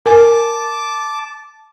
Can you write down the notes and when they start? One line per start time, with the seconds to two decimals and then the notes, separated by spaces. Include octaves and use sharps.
0.06 A#4 G#5 A5 D6